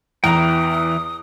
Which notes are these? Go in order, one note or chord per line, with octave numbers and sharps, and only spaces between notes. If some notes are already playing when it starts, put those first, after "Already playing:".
E2 E3 G5 A#5 D#6